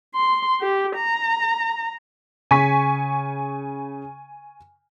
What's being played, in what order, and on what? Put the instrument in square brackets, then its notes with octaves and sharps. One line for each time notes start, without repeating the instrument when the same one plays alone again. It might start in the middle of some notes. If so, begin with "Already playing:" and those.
[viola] C6
G4
A#5
[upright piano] C#3 [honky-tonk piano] G#5 C#6 B6